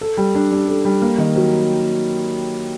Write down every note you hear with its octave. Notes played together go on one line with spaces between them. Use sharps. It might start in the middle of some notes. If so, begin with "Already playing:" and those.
A4
G3
D4
G3
A4
G3
A#3
D#3
F#3